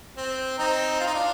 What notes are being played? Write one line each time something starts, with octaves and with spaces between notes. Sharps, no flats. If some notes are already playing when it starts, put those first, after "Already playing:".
C4
C4 D#4
F4
D#4
D4 F4